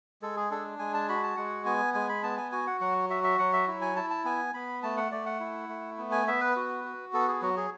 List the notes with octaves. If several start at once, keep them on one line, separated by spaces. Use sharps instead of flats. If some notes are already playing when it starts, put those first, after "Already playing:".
G#3 A4
G#4
D4 A4
G#3 G#5
A5
F#4 B5
A5
G#3 F#5
B3 G#5
G#3 G#5
B5
B3 A5
G#5
F#4 G#5
F#5
F#3 F#5
F#4 E5
E5
F#3 F#5
E5
E4
G#5
E4 A5
A5
B3 G#5
B3 B5
A3 A5
F#5
A3 D5
F#5
E4
A3
B3
G#5
B3 E5
B4
F#4
F#4
B3 A4
G#4
F#3 F#4
G#4